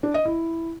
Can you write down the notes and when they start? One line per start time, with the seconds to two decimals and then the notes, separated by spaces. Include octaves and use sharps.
0.03 D4
0.14 D#5
0.25 E4